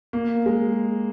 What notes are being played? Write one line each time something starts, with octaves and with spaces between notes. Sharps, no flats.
A#3
G#3